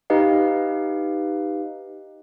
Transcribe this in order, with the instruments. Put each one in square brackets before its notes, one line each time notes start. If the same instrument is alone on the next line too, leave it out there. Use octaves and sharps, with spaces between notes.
[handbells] D#4 G4 B4 D#5 F5